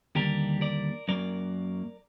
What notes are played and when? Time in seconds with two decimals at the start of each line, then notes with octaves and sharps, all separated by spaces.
0.15 D#2 D3 G3 A#3 G4 A#4
0.61 A#4 D5
1.08 F#2 F#3 A#3 A#4 D5